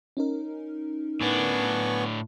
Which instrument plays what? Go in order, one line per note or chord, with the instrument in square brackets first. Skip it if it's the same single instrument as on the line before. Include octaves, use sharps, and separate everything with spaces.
[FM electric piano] C#4 D#4 A#4
[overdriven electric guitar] A2 D4 [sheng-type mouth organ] B3 G#5 C#6